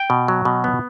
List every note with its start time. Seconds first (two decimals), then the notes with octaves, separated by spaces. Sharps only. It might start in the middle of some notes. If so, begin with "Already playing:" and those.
Already playing: G5
0.10 B2
0.28 F#3
0.45 B2
0.64 B3